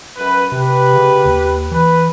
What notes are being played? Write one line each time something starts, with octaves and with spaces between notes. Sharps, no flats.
F#2 B4
C3 G4 B4
C#3
D#2
E3 B4